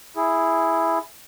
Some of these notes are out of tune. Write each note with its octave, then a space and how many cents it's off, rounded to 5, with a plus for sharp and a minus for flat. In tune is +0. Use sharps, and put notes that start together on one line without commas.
E4 +0 G#4 +0